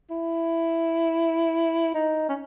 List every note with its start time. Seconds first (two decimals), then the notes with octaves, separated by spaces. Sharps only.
0.10 E4
1.94 D#4
2.29 C#4